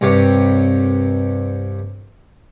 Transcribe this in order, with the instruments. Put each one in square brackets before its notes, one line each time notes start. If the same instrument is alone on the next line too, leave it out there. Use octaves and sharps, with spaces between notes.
[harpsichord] C2 G2 C3 C#5